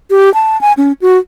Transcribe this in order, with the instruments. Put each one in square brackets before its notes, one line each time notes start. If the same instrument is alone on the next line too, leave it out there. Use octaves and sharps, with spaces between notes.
[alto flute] G4
A5
G#5
C#4
F#4